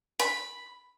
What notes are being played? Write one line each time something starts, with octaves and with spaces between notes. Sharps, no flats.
B5